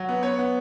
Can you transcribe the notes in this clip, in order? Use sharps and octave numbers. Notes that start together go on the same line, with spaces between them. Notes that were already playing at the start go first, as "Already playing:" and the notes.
Already playing: F#3
B3
B3 C#5
B3